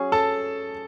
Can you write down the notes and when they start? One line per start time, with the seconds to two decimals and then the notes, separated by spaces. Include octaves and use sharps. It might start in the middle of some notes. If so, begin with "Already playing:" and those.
Already playing: F#3 C#4 G#4
0.12 A4 A5